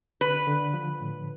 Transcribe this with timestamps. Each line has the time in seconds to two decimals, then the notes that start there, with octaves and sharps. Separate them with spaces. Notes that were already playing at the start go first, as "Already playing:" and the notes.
0.21 D3 B4
0.47 D3
0.74 F3
1.00 A2